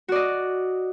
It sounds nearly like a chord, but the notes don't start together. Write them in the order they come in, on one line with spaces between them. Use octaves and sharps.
F#4 D5 D#5